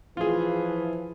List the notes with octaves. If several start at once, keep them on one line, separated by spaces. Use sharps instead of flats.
E3 F3 E4 F4 G#4